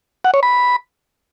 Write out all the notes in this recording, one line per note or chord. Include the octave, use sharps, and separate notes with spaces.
F#5
C#5
B5